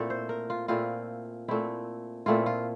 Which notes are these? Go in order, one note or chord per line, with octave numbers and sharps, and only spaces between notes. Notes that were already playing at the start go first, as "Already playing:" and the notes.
Already playing: A#2 A3 C4 E4 A4
C5
A#4
F4
A#2 A3 C4 E4 F4
A#2 A3 C4 E4
A#2 A3 C4 E4 F4
F4